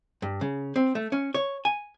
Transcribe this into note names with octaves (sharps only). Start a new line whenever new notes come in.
G2
C#3
C4
A3
C#4
C#5
G#5